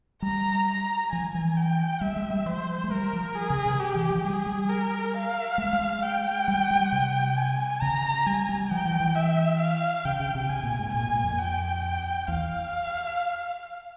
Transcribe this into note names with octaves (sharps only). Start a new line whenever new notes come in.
G3 A#5
A#5
F3 G#5
E3
G5
G3 E5
G#3
G3
F3 C5
G#3
G3 A#4
F3
G#4
C#3
C3
G4
E3
F3
G3 G#4
G3
A#4
F5
G#3
G#3
G5
G3
G3
C3
G#5
C#3 A#5
G3 G#5
G3
F3 G5
E3
E3
E5
F5
C#3 G5
C#3
C3
C3 G#5
A#2
G#2
A#2 G#5
A#2
F2
G5
E2 F5